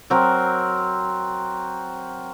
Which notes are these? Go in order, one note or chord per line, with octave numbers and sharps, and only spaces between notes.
F#3 C4 A#4